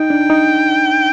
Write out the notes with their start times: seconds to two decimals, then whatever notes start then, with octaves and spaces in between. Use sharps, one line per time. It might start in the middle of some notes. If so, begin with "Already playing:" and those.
Already playing: D#4 G5
0.10 D4
0.30 D#4